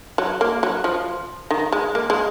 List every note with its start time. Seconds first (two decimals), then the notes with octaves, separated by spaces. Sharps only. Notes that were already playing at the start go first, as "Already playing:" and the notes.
0.18 F#3
0.41 A#3
0.63 F#3
0.84 F3
1.51 D#3
1.72 G#3
1.95 A#3
2.10 G#3